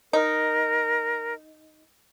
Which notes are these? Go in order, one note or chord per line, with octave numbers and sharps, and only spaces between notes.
D#4 A#4